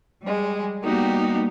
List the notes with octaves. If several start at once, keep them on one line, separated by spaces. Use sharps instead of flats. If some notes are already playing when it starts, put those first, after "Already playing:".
G3 G#3
G3 A#3 B3 D#4 F#4 G4